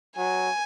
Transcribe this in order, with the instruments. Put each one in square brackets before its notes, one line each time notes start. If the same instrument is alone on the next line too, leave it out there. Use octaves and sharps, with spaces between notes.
[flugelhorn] F#3 [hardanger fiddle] G#5